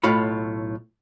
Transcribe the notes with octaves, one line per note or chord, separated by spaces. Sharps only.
B1 A2 F4 C#5 B5